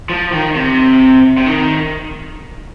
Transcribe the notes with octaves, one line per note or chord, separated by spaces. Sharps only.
F3
D#3
C3
C3
D#3